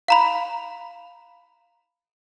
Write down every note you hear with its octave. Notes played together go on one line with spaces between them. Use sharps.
F5 A#5 B5